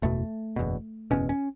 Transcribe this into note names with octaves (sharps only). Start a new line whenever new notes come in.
F#1 E2 B2 A3
F#1 E2 B2
F#1 E2 B2 C#4
C#4